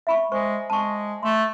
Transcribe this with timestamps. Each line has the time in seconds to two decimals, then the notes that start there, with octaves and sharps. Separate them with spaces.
0.07 E5 B5 C#6
0.32 G#3 C5 C#6
0.70 G#3 A5 C#6
1.23 A3 C6